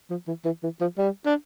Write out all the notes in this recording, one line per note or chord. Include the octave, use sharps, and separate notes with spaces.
F3
E3
E3
E3
F3
G3
D4